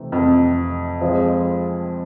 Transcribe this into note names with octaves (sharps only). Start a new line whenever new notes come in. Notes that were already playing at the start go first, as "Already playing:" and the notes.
Already playing: C3 E3 A3 C4 D#4
F2
F3 G#3 C4 F4